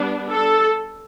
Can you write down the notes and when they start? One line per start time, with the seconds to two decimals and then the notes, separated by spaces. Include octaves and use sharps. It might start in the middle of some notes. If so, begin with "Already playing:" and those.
Already playing: G3 B3 D4
0.31 A4